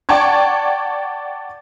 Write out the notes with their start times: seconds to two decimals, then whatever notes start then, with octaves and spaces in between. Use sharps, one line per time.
0.09 D5 F#5 G5 A5 C#6 G#6